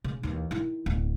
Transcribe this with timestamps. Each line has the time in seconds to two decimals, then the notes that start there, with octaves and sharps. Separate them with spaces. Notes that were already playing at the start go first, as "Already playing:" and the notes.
0.04 C#3
0.23 D#2 E3
0.51 D#3 E4
0.86 D1 B3